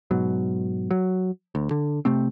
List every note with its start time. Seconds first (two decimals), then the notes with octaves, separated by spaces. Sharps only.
0.11 G#2 B2 F#3
0.91 F#3
1.55 D2
1.71 D3
2.05 C3 A3 C4